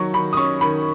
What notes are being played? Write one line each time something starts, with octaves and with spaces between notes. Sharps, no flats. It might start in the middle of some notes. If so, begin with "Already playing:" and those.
Already playing: D#3 F#3 C#6
D#3 B5
D#6
C#4 C#6
D#3 B5